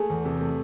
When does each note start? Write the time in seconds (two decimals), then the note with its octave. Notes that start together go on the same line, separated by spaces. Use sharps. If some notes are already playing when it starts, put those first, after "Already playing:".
Already playing: A3 G#4
0.10 E2
0.25 C3
0.41 A3